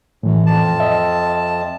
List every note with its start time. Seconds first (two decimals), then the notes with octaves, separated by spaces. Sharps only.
0.23 F#2 A2 E3
0.46 F2 A5
0.80 D#5 E5